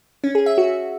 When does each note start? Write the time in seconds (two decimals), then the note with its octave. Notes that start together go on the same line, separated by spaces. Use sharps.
0.24 C#4
0.35 G#4
0.46 E5
0.58 F#4